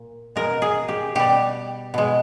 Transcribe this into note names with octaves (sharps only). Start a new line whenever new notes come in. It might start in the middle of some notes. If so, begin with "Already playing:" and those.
Already playing: A#2
B2 G#3 A#4
G#4
G4
B2 G3 G4
B2 G#3